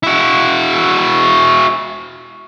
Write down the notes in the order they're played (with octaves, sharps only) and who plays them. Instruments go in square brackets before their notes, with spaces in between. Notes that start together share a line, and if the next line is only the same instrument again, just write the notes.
[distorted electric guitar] E4 F#4